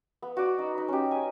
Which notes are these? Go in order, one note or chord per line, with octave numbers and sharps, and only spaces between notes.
B3
F#4 D5
D#4
D#4 B5
C#4 G4
G#5